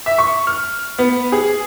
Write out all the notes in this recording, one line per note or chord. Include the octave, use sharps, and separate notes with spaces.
E5
C#6
F6
B3
G#4